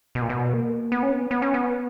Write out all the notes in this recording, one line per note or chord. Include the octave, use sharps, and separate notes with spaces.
B2
A#2
B2
A#3
B3
C#4
B3
B3
C#4
B3